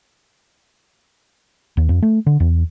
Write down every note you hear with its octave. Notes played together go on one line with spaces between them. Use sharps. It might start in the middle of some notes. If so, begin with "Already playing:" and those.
D#2
F2
A3
D3
E2